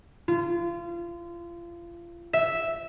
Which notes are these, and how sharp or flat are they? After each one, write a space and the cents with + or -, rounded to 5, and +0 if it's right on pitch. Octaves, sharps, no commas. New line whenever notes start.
F4 -30
E5 -5